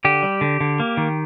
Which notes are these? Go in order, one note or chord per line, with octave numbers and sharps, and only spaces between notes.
D3 G4
G3
D3
D3
A#3
D#3